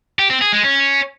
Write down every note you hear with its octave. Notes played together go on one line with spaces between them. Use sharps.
G4
C4
G#4
G#3
C#4